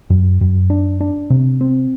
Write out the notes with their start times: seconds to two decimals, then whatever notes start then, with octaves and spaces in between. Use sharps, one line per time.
0.10 F#2
0.41 F#2
0.70 D4
1.01 D4
1.30 C3
1.61 C4